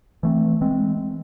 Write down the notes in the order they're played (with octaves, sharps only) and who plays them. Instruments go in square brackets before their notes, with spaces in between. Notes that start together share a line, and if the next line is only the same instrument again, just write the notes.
[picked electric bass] E3 A3 C4
E3 G#3 C4